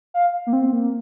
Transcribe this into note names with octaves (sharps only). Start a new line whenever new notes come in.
F5
A#3
C4
A#3